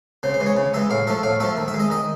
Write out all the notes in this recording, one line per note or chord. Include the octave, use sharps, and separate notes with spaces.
C#3 C5
C5
E3 G#3
C#5
C#3
E3 G#3 E5
A2 F5
F3 A3 E5
A2 F5
F3 A3 E5
D#3
E5
G#3
D#5
D#3 D#5